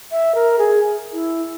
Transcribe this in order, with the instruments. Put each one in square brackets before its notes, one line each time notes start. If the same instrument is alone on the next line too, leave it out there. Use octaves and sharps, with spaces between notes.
[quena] E5
A#4
G#4
E4